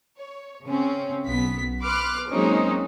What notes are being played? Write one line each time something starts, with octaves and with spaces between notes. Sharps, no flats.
C#5
C#3 C4 C#4
B1 B3 B6
B4 C6 D6 F6 F#6
F#3 G#3 A#3 C4 C#4 D#4